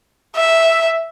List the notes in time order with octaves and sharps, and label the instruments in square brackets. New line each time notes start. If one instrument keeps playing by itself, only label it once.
[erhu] E5